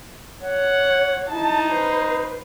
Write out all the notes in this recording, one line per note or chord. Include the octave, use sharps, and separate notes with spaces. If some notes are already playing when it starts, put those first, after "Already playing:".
C#5 F#5
D#4 E4 A5
B4 C5